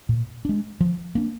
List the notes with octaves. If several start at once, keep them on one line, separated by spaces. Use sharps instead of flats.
A#2
G#3 D4
F3
A#3 D4